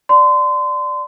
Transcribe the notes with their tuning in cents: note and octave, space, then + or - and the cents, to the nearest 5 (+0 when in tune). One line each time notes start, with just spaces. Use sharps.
D5 +0 C6 -30